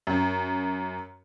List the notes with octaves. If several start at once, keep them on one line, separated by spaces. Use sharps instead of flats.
F#2